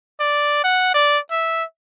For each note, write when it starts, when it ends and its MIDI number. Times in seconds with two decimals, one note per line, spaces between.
0.20 0.62 74
0.64 0.93 78
0.94 1.18 74
1.31 1.64 76